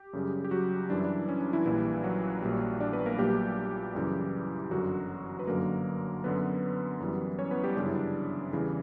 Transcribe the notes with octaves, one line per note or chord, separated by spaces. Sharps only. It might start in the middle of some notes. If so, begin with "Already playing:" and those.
Already playing: G4
F#2 C#3 G3
G4
F#3 F#4
F#2 E3 G3 D4
E4
D4
C#4
D4
E3 E4
A#1 A#2 E3 G3 E4
F#3 F#4
A#1 A#2 G3
D4 D5
B3 B4
A#3 A#4
A#1 A#2 F#3 G3 G4
F#2 C#3 E3 G3
G1 F#2 D3 F#3 F#4
B4
G1 F#2 D3 F#3 A#3 A#4
F#2 D3 F#3 B3 B4
F#2 E3 G3
C#4 C#5
B3 B4
G3 G4
G1 F#2 C#3 G3 D4
E4
D4
E2 C#3 E3 G3